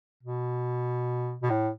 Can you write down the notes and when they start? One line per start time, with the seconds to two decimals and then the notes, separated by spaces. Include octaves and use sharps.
0.24 B2
1.42 B2
1.50 A2